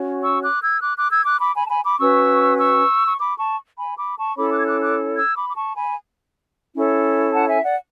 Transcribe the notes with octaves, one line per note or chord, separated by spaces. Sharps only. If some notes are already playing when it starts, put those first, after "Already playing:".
Already playing: C#4 F#4 C#5
C#6 E6
D6 F#6
E6 G#6
D6 F#6
D6 F#6
E6 G#6
D6 F#6
B5 D6
G#5 B5
A5
G#5 B5
B5 D6
C#4 F#4 B4 C#6 E6
C#6 E6
C#6
B5 D6
A5 C#6
G#5 B5
B5 D6
A5 C#6
C#4 E4 A4 C#5 B5 D6
D6 F#6
G#6
D6 F#6
D6 F#6
E6 G#6
B5 D6
D6
A5 C#6
G#5 B5
C#4 E4 A4 C#5
F#5 A5
E5 G#5
D5 F#5